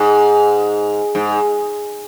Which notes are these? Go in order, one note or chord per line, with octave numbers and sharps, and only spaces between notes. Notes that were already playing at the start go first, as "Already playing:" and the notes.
Already playing: G#2
G#2